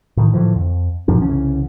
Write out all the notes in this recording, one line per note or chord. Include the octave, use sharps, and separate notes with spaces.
A2 D#3
A2 D3 E3 F3
F2
F#2 A#2 F3 D4
C2 C#3 E3 C#4